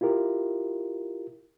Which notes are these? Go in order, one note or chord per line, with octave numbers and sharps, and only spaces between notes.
E4 F4 G4 A#4